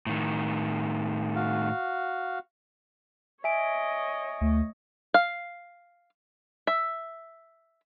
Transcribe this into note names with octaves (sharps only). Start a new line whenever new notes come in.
A2 D#3
F#4 F5
C#5 D#5 E5 G#5 D7
D2 A3
F5
E5